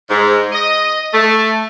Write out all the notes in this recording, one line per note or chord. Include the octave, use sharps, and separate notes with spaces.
G#2
D#5
A3